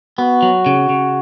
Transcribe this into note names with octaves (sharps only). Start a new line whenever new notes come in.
B3 F#4
F#3
C#3
C#3